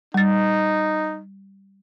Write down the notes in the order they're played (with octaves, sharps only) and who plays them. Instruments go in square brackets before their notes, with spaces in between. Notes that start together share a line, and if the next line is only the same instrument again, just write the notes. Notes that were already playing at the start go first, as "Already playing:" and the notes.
[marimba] G3 A6 [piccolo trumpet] D#4